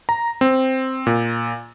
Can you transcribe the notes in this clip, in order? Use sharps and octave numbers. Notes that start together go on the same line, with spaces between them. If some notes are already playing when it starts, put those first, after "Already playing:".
A#5
C4
A#2